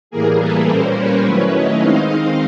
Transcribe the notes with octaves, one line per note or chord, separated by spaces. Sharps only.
A2 E3 G3 A#3 G#4 A#4
A4 B4
A#2 G3 A#3 C#4 A#4 C5
B4 C#5
D#3 F#3 A3 C#4 E4
C#5 D#5
D#3 G#3 C4 D#4 D#5 F5